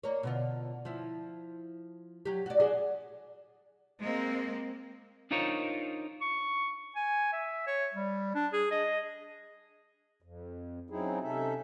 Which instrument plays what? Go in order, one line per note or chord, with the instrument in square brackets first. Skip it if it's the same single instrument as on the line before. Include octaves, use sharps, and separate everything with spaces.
[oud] A#3 C#5
B2 D3 F4
F3 E4
F#3 G4
F#4 D5
D4 F#4 G#4
[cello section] G#3 A#3 C4
[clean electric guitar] D4 D#4 F4 A#4 C5 C#5
[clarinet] C#6
G#5
E5
C#5
G3
D4
G#4
D#5
[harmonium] F2
C#3 F#3 C4 D#4 E4 G#4
C3 C#4 D#4 A4 E5